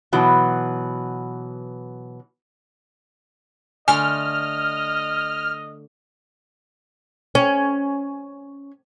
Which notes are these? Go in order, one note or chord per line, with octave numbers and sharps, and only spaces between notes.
B2 E3 F#3
D3 A3 D#5 G#5 F6
C#4